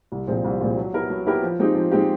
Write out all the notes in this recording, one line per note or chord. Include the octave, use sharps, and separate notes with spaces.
C2
A#2 F3 G#3 C4
C2
A#2 F3 G#3 C4
F#3
B3 E4 G4 A#4
F#3
B3 E4 G4 A#4
F3
G#3 C4 D#4 G4
F3
G#3 C4 D#4 G4